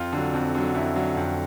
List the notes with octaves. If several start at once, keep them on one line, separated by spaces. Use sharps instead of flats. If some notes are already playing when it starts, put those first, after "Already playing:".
Already playing: F2 F4
D3 F#3
F2
D3 F#3
F2 E4
D3 F#3
F2